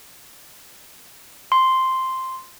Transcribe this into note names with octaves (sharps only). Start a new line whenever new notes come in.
C6